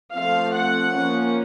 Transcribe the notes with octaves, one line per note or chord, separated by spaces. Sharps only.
F3 A3 C4 F5
F#5
F3 A#3 C#4